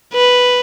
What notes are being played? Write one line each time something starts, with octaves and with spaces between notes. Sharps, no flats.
B4